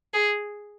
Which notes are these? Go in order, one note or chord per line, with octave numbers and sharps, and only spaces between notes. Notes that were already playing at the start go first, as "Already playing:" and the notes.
G#4